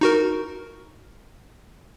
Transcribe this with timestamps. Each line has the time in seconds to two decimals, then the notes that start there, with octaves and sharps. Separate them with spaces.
0.01 D#4 F#4 A#4